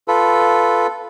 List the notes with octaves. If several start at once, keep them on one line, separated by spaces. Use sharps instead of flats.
F4 A4 B4